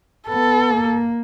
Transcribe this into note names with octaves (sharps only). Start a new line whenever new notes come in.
B3 A4
A#3